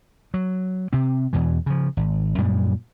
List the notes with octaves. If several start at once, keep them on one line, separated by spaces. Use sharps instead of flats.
F#3
C3 C4
E2 B2 E3
C#3 F3
G#1
F#2 A#2 G3 G#3